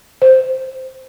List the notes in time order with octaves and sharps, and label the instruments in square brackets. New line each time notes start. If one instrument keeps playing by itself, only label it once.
[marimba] C5